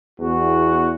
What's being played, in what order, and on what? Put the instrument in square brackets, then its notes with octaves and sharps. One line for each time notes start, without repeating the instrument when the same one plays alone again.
[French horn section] E2 [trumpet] F#4